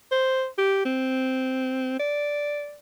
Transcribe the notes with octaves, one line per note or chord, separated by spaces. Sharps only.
C5
G4
C4
D5